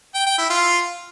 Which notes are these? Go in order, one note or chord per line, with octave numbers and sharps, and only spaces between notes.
G5
G5
E4
F4